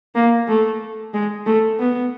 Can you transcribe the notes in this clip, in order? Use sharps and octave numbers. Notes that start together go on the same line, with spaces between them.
A#3
A3
G#3
A3
B3